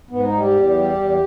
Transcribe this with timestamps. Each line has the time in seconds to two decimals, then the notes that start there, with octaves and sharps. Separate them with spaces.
0.10 G#2 B3
0.25 D#4
0.32 G3
0.40 G4
0.53 E2
0.74 G3
0.96 E2